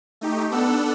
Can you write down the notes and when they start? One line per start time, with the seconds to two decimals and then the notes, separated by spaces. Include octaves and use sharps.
0.21 A3 D#4 G4
0.51 B3 D4 A4 F#5 E6